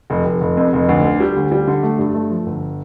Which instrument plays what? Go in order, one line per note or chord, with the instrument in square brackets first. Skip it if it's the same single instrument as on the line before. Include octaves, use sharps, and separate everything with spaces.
[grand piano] F1
F1
F1
F2
F1
D2
D3
G3
D2
G3
D3
A3
G2
A3
F3
G1